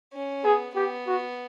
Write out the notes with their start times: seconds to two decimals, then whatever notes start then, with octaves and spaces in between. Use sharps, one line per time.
0.13 C#4
0.45 B3 G#4
0.75 B3 G4
1.07 F#4